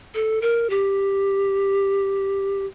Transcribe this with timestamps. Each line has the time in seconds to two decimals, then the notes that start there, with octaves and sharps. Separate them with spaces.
0.15 A4
0.42 A#4
0.70 G4